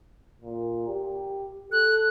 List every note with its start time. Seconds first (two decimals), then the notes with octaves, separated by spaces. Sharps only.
0.42 A#2
0.88 G4
1.72 A4 F#6